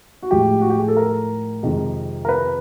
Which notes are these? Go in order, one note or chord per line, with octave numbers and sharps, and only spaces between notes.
F#4
A2 F3 G#3 G4
F#4
G4
G#4
A4
A#4
F2 C3 D#3 G#3
A#4
B4